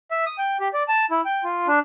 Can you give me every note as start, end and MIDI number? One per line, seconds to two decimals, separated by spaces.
0.11 0.24 76
0.26 0.36 87
0.38 0.57 79
0.60 0.68 67
0.74 0.83 74
0.88 1.05 81
1.11 1.21 64
1.25 1.44 79
1.44 1.67 65
1.68 1.79 62